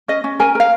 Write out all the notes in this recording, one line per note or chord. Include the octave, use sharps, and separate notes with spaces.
C#4 D#5
C#4
A#4 G#5
A#4 F5